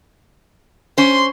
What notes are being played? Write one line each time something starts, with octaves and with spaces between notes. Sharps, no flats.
C#4 C5 C6